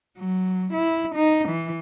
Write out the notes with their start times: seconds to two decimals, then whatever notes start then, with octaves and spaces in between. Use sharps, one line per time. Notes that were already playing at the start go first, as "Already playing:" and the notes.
0.18 F#3
0.73 E4
1.15 D#4
1.49 E3